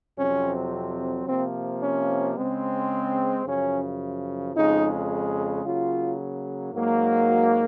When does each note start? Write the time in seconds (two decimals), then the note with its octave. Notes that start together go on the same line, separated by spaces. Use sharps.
0.17 F2 C3 F#3 C4 C#4
1.26 C3 F3 A#3 C4
1.81 C#4
2.36 C#3 G#3 C4
3.46 F#2 C#3 F3 C#4
4.55 F2 C#3 G#3 D#4
5.64 C#3 F#3 A#3 F4
6.74 G#2 F#3 A#3
7.29 F#4